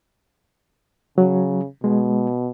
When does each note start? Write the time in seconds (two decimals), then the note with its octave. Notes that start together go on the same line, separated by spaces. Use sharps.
1.18 C#3 F#3
1.84 B2 G#3